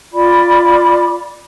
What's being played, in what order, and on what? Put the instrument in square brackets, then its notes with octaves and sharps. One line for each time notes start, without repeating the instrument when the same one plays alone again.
[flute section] F4 D5 B5 D6